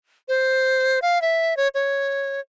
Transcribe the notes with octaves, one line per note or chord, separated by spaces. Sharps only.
C5
F5
E5
C#5
C#5